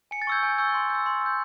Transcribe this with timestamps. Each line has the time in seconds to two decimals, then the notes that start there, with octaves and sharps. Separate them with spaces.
0.11 G#5 C#7
0.22 A6
0.27 C#6 E6 G6 G#6
0.43 G#5 G6
0.58 C#6 E6 G6
0.74 C6
0.90 E6 G6
1.06 C6
1.21 E6 G6